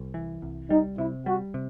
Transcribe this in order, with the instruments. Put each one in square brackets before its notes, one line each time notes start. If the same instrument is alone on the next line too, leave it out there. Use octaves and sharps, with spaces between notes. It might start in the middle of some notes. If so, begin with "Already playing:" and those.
Already playing: [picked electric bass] C2
E3
C2
[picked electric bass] G3 [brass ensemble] D#4
[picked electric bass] C3 [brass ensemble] E4
[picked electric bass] G3 [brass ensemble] F#4
[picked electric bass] C3